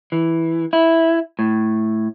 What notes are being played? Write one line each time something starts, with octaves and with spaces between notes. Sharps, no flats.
E3
E4
A2